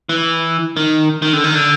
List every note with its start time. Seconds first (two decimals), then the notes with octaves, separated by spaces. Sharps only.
0.09 E3
0.76 D#3
1.22 D#3
1.33 D3
1.44 D#3
1.55 D3